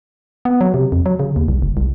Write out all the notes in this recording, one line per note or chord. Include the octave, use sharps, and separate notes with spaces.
B3
F#3
C3
F2
F#3
C#3
D#2
C2
F#1
C2